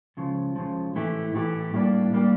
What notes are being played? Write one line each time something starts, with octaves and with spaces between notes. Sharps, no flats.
C#2 C#3 F3
C#2 C#3 F3
A2 E3 A3 E4 G4
A2 E3 A3 E4 G4
A2 G3 A#3 D4 G4
A2 G3 A#3 D4 G4